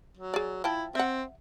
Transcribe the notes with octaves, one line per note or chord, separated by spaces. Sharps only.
F#3
G#4 D5
F3 E4 G5 A5
C4 E5 F#5